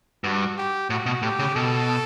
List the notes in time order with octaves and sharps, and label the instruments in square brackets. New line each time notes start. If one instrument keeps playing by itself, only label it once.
[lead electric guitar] G2 [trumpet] F#4
[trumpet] G4
[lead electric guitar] A2 [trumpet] F#4
[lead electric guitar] B2
[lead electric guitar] A2 [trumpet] G4
[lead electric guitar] C#3
[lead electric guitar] B2 [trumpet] A4